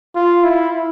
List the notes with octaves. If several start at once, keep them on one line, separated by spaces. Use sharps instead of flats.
F4
E4